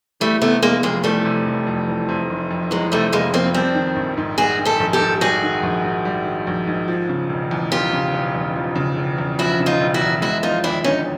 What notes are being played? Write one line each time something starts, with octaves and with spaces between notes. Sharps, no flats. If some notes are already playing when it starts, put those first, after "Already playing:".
E3 G3 A3
C3 A3 B3
F1 G#3 A#3
F2 G#3 A#3
E3 G3 A3
C3
F1
F2
E3
C3
F1
F2
E3 F#3 G#3
C3 G3 A3
F1 G#3 A#3
F2 A#3 C4
G3 C4 D4
D#3
A#1
G#2
G3 F#4 G#4
D#3
G4 A4
A#1
G4 A4
G#2
G3 F#4 G#4
D#3
A#1
G#2
G3
D#3
A#1
G#2
F3
C#3
E1
E2
F3 F4 G4
C#3
E1
E2
F3
C#3
E1
E2
F3 E4 F#4
C#3
D#4 F4
E1
E4 F#4
E2
G#3 E4 F#4
F3 D#4 F4
D#2 D4 E4
D3 C#4 D#4